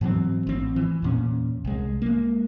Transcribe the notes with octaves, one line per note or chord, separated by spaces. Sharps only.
G#2 E3 F#3 C4
A1 C4
E3
E2 A#2 C#4
C2 G#3
G#3 A#3